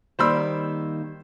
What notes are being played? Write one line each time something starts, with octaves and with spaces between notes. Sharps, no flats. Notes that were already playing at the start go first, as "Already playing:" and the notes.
D#3 G3 A#3 C5 B5 E6